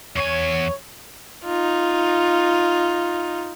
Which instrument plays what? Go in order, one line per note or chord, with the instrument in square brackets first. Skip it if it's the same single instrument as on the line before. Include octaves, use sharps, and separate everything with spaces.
[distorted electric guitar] E2 G#5 [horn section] C#5
[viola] D#4 F4